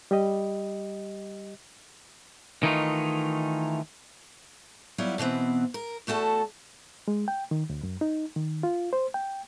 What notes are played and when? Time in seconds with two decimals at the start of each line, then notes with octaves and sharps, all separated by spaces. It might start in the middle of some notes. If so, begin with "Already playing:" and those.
0.11 G3 G4 D#5
2.63 D#3 E3 A3 D#4 F4
4.98 F#3 G3 B3 E4 F4
5.18 B2 E3 B3 C4
5.74 A#4
6.07 E2 A3 F#4 A4 A5
7.08 G#3
7.28 G5
7.51 D#3
7.70 D2
7.83 F#2
8.01 D#4
8.36 D#3
8.63 F4
8.93 C5
9.14 G5